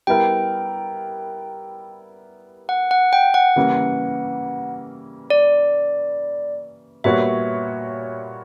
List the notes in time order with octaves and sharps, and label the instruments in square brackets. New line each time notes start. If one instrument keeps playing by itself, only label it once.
[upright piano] G3 B3 E4 A#4 [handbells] G5
[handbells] F#5
F#5
G5
F#5
[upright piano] C#3 E3 G3 A#3 C#4
[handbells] D5
[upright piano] A#2 G3 B3 F#4 C#5 [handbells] E5